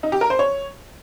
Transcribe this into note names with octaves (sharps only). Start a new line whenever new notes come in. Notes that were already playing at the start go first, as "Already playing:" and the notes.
D#4
G4
A#4
C5
C#5